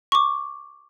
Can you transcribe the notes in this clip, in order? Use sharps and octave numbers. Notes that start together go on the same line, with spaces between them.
C#6 D6